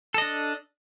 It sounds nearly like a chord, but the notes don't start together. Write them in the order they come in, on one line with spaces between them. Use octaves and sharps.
A4 D#5 D4